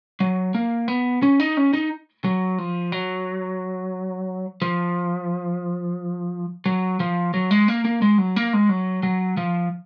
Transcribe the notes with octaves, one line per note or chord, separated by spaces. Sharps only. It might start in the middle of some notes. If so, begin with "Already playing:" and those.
F#3
A#3
B3
C#4
D#4
C#4
D#4
F#3
F3
F#3
F3
F#3
F3
F#3
G#3
A#3
A#3
G#3
F#3
A#3
G#3
F#3
F#3
F3